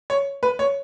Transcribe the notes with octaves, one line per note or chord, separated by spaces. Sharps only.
C#5
B4
C#5